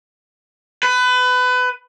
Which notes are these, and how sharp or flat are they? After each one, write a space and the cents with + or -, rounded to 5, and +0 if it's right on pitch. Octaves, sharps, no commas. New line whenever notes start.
B4 +25